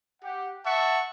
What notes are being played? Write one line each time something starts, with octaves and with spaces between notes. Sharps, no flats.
G4 F#5
E5 F#5 A5 C#6